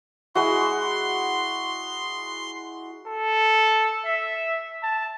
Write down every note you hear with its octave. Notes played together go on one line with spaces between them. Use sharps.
G#3 E4 F#4 C6
A4
E5
A5